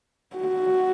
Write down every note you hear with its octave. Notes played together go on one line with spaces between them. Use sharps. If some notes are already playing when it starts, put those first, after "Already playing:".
F#4